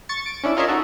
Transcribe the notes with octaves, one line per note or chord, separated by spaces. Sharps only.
C#6 A6 C#7
D7
C#4 D4 E4
F4 G#4 A#4 C#5 D#5 E5
D#4 F#4 A4